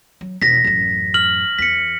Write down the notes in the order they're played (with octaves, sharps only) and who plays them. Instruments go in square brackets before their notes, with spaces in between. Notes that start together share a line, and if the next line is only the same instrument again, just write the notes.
[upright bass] F#3
[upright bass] E1 [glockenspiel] A#6 B6
[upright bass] A1 F#2
[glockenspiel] F6 F#7
[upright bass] E2 [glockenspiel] B6 C#7